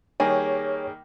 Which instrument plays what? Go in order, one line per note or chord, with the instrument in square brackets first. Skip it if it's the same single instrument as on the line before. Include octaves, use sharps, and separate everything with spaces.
[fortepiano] D#3 G3 A#3 [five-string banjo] G#4 [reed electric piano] C#5